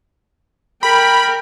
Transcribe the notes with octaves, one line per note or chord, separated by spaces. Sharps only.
A#4 G5 B5